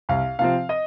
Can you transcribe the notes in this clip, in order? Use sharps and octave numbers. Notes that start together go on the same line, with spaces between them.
C2 F5
C3 F3 C4 F5
D#5